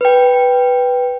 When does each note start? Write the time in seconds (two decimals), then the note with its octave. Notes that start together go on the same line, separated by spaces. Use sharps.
0.01 B4 G5